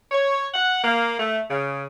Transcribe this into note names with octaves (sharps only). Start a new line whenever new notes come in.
C#5
F#5
A#3
A3
C#3